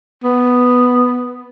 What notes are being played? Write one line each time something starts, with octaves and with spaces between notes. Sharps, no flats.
B3